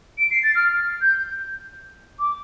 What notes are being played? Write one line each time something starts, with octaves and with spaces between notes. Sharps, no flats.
D7
C7
A6
F6
G6
D6